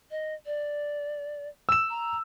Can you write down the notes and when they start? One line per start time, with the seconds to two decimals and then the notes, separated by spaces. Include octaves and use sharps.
0.11 D#5
0.46 D5
1.69 E6 E7
1.90 A#5